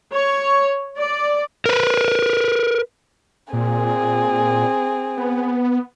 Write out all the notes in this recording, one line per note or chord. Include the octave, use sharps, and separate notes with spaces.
C#5
D5
A#4 B4
A#2 C4 G#4
B3